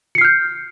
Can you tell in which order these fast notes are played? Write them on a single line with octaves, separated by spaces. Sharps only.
C#7 C7 F6 G6